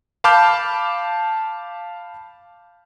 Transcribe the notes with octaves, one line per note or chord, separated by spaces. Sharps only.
F5 A5 B5 D6 F6 G6